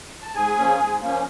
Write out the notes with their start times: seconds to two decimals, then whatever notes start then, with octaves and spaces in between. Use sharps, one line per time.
0.22 A5
0.35 G#2 G#4 G#5
0.57 F3 A#3 C#4
0.79 G#2
1.00 F3 A#3 C#4